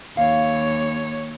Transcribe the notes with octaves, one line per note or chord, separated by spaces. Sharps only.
D#2 C#5 F5